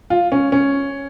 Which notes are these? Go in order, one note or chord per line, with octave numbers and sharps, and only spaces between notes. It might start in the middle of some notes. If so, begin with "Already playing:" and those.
F4
C#4
C#4